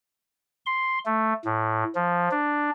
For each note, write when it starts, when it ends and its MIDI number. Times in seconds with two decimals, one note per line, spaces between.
0.66 0.99 84
1.06 1.34 57
1.45 1.84 45
1.95 2.29 53
2.31 2.70 62